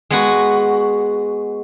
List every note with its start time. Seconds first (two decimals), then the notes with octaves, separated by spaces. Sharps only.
0.11 G#3 B3 F#4